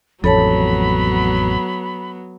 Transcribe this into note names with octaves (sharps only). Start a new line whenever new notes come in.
A1 F2 F#3 B3 A4 C#5 A5 B5